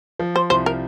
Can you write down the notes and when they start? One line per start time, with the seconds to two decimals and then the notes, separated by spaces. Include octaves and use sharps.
0.19 F3
0.36 C5
0.50 C2 C5
0.66 A#4